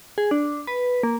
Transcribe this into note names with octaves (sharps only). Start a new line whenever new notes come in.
G#4
D4
B4
A#3